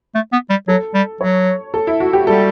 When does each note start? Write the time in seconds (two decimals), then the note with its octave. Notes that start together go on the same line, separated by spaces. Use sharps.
0.15 A3
0.32 B3
0.50 G3
0.68 F#3 A4
0.94 G3
1.21 F#3 C#5
1.74 A4
1.87 E4
2.00 F#4
2.13 G4
2.27 G3 A4